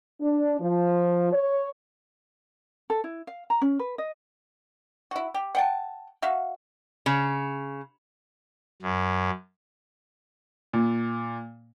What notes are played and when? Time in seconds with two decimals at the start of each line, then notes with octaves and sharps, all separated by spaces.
0.21 D4
0.60 F3
1.33 C#5
2.90 A4
3.04 E4
3.27 F5
3.50 A#5
3.62 C#4
3.79 B4
3.98 D#5
5.11 E4 F#4
5.34 G4
5.55 F#5 G5 A5
6.22 F#4 E5 F5
7.06 C#3
8.82 F#2
10.73 A#2